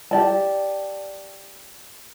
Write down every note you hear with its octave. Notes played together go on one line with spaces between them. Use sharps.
G4 D5 A5